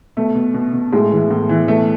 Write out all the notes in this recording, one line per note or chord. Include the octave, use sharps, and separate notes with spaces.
B2 A3
B2
B2
B2
A2 G#3
E3
A2
E3
B2 A3